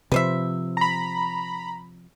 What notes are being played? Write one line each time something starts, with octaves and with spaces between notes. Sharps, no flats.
C3 F3 B4 C5 E5
A#5 B5